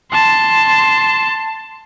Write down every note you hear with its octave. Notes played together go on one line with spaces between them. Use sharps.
A5 C6